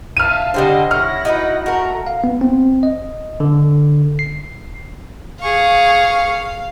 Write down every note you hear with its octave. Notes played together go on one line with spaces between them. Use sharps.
E5 F5 A5 F6 D#7
D3 G3 D4 C5 D#5
C#4 E4 F#5 F6 A#6
D#4 F#4 B4
A3 F#4 A#4 A#5
F5
B3
C4
D#5
D3
C7
G#4 F5 C#6